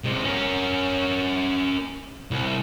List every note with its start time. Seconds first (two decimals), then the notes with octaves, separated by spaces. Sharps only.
0.04 C3 G#3
0.25 C#4 A#4
2.31 C2